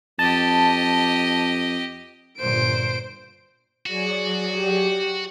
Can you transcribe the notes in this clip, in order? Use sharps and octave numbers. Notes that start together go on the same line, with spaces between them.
F2 G4 D#5 A5
G1 A#2 C5 D7
F#3 F#4 G#4 D5
G4